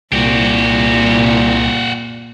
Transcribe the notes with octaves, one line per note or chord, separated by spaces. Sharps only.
C2 A#2 F#4 G4